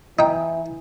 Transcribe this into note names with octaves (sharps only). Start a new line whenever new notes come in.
E3 D#4 G5